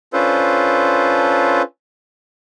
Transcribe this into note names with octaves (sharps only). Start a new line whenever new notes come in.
C#4 D4 F4 A4 B4 C5